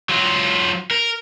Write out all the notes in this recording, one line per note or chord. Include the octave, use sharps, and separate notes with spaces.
F#3 F4
A#4